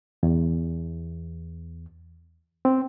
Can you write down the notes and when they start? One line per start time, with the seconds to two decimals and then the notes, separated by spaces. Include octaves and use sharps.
0.23 E2
2.65 C4